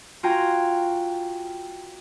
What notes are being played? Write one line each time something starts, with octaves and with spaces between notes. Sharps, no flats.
F4 F#4 G5 G#5 A#5